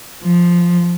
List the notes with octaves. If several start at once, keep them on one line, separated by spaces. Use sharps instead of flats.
F3